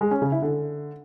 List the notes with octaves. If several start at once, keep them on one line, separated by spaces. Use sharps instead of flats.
G#3
C#4
C#3
E4
D3